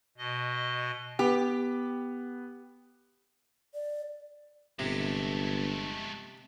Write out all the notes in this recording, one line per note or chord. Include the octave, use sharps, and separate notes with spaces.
B2 D#5
B3 G4
D5
G1 C3 G#3 A3